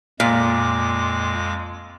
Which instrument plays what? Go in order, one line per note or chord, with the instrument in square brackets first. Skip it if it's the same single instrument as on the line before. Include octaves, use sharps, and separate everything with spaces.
[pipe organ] F2 G#3 D6 [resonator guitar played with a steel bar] A#2